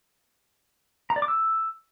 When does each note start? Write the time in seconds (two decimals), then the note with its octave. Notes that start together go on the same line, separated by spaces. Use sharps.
1.10 A#5
1.16 D5
1.22 D6
1.28 E6